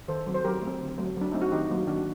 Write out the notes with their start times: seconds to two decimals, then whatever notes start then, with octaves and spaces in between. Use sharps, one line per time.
0.08 D#3 A4 C5
0.27 F#3 C4
0.34 C5
0.44 F#3 G4 A#4
0.62 A3 C4
0.80 D3
0.98 F#3 A3
1.17 F#3 D4
1.32 A3 C4 D#4
1.41 F#4
1.52 D#3 D#4 G4
1.69 F#3 A#3
1.87 D#3 D4 F#4